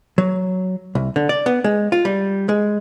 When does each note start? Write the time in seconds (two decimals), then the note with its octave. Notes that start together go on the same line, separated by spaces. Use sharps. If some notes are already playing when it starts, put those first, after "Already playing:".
0.18 F#3
0.95 C2
1.16 D3
1.29 D5
1.46 B3
1.64 G#3
1.92 F4
2.05 G3
2.49 G#3